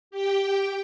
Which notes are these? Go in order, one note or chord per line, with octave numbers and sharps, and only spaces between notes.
G4 G5